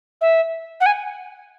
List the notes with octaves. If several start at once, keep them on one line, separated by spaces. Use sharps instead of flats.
E5
F#5
G#5